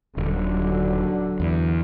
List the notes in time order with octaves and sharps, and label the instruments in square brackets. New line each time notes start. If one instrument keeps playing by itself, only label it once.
[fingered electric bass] D#1 [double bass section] D3 F#3
[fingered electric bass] E2